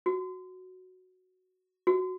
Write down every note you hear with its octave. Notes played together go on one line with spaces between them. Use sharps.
F#4
F#4